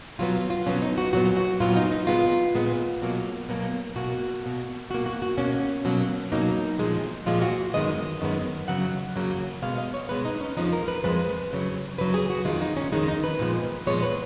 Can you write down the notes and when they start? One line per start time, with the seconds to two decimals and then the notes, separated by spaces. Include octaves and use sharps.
0.19 B2 F#3 B3 F4
0.50 F4
0.66 B2 F#3 B3 C#4
0.82 D#4
0.98 F#4
1.13 A#2 F#3 B3 F#4
1.37 F#4
1.60 A#2 F#3 B3 F4
1.76 D#4
1.92 D#4
2.07 A#2 G#3 B3 F4
2.55 A#2 G#3 B3
3.02 B2 F#3 A#3
3.49 B2 F#3 A#3
3.96 B2 A#3 F#4
4.43 B2 A#3
4.90 B2 A#3 F#4
5.06 F#4
5.22 F#4
5.37 B2 A#3 C#4
5.85 B2 F#3 A#3
6.32 B2 F#3 A#3 D#4
6.79 A#2 F3 G#3
7.26 A#2 F3 G#3 F4
7.42 F#4
7.73 F#2 D#3 G#3 B3 D#5
8.21 F#2 D#3 G#3 B3
8.68 F#2 C#3 F#3 F#5
9.15 F#2 C#3 F#3 A#3
9.62 B2 G#3 B3 F5
9.78 D#5
9.94 C#5
10.09 B2 G#3 B3 B4
10.25 D#4
10.41 C#4
10.57 F2 F3 G#3 D#4
10.73 A#4
10.88 B4
11.03 F2 F3 G#3 B4
11.51 F#2 C#3 F#3
11.98 F#2 C#3 F#3 B4
12.14 G#4
12.30 F#4
12.45 F2 D#3 G#3 F4
12.62 D#4
12.77 C#4
12.92 F2 D#3 G#3 D#4
13.08 D#4
13.24 B4
13.39 A#2 F3 G#3 B3
13.87 A#2 F3 G#3 B3 C#5
14.03 B4